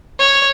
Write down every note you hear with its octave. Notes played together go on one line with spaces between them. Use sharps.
C#5